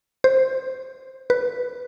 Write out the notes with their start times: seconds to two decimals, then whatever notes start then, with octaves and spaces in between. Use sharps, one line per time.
0.24 C5
1.30 B4